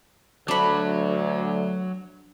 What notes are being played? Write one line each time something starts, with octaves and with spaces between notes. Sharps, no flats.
D2 F#3 D4 B5